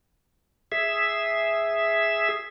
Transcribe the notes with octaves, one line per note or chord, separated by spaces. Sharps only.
G#4 E5